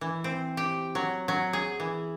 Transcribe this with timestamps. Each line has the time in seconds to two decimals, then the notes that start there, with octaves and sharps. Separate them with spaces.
0.01 E3
0.24 C4
0.57 G4
0.95 F#3
1.28 F#3
1.53 G#4
1.80 E3